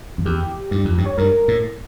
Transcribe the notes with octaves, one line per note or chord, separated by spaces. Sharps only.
F2
E2 G4
G2
F2
G2
C#5
G2 A#4
A2